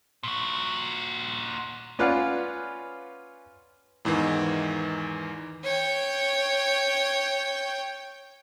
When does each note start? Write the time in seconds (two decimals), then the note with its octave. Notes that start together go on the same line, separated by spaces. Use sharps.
0.23 A#2 F#4
1.99 C#4 F4 B4 D5 F5 F#5
4.05 E2 G#2 D#3 E3
5.64 C#5 G5